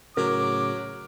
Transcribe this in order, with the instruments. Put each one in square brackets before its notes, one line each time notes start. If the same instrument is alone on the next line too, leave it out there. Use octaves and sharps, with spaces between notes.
[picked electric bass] A2 C#3 [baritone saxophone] F#3 [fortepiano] A#4 [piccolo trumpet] D6